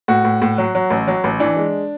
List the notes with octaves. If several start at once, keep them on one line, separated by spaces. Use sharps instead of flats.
A2 F#4
A2
A2
F#3
F#3
A1
F#3
A1
E3 D4
G#3